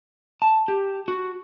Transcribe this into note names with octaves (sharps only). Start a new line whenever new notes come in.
A5
G4
F#4